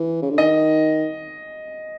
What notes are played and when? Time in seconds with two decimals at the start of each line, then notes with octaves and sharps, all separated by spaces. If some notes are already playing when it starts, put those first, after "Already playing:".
Already playing: E3
0.22 C#3
0.30 D3
0.38 D#3 D#5